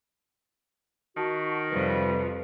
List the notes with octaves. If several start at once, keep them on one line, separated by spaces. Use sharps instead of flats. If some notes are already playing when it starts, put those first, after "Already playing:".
D#3 F#4 A5
F2 C3 F3 G3 B4